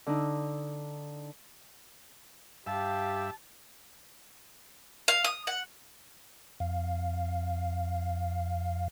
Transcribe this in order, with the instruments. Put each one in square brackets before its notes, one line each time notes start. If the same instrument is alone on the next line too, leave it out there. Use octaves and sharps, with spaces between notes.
[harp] D3 D4 D#4
[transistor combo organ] G2 E5 [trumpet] G4 [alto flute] F5 [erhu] A5
[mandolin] F5
D#6
F#5
[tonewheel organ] F2 F5